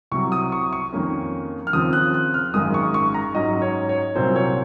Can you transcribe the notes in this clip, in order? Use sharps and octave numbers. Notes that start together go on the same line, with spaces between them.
C2 C3 F#3 C#6
D#6
C#6
C#6
F2 D#3 A#3 C#4
F6
D#2 C#3 F3 C4 D#6
F#6
F#6
F6
G#1 F#2 D#3 G#3 D#6
C#6
C#6
A#5
G#2 F#3 C#4 D#5
C#5
C#5
C2 A#2 F#3 C4 C5
C#5